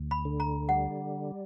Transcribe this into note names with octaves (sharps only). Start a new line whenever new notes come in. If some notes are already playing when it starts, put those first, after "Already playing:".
Already playing: D2
B5
D3
A#5
G3 F#5